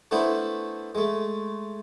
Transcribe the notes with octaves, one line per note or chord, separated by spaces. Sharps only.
A3 B3 D4 E4 C5
G#3 A3